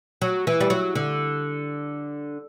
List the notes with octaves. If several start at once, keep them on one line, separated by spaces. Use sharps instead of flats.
F#3
E3
G3
F#3
D3